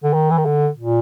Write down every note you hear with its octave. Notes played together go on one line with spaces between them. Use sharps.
D3
D#3
E3
D#3
D3
A#2